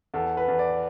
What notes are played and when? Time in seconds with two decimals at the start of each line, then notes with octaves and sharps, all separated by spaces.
0.14 E2 A4
0.37 B4
0.48 E2
0.59 D5